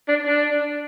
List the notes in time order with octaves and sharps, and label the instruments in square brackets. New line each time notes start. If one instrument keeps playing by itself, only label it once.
[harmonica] D4
D4